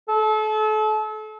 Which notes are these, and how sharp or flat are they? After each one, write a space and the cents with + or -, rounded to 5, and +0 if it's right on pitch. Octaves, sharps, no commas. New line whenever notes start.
A4 -35